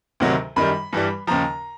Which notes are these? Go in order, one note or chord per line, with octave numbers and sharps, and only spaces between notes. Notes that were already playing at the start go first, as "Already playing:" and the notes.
D2 C3 D#3 F#3
F#2 D#3 G3 B5
G2 E3 G3
D#2 C#3 F3 A#5